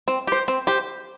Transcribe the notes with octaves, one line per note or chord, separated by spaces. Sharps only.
C4
G4 C5
C4
G4 C5